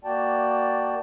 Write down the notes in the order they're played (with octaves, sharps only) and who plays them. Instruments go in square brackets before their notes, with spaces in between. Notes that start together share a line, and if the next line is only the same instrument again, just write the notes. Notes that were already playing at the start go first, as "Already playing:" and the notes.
[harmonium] A#3 F#4 D5 G5 A5